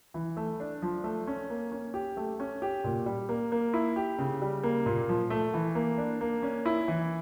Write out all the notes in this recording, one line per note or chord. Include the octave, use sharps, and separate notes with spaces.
E3
A3
D4
F3
A3
C#4
A#3
C#4
G4
A3
C#4
G4
A#2
G3
A#3
A#3
E4
G4
C#3
G3
A#3
A#2
F3
A3
E3
A#3
D4
A#3
C#4
E4
E3